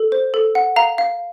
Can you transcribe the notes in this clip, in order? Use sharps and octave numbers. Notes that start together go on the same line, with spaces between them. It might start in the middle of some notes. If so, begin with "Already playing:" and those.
Already playing: A4
C5
A4
F#5
F5 A#5
F5